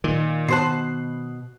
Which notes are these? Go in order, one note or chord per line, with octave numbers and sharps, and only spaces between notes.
A#2 D#3
B2 C5 A5 F#6 C7